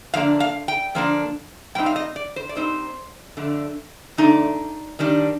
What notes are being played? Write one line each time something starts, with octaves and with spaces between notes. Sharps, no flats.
D3 F3 A#3 D4 F5
F5
G5
D3 F3 A#3 D4
A#2 G3 C4 D#4 G5
F5
D#5
D5
C5
D5
A#2 G3 C4 D#4 C5
F2 D3 A3 D4
F2 D3 A3 D4 D#4
D#3 G3 D4